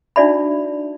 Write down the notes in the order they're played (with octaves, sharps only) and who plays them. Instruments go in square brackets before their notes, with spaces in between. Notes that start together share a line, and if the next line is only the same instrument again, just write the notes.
[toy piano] D4 D#4 F#4 D5 E5 B5